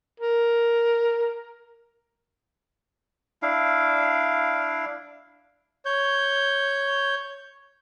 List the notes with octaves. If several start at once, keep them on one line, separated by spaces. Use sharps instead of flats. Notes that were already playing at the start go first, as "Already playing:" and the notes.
A#4
D4 E4 F5
C#5 G6